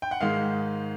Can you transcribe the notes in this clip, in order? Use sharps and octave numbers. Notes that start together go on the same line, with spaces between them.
G5
F#5
G#2 D#3 G#3 F5